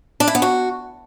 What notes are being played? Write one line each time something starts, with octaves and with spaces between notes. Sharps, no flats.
D4
E4
B3
F#4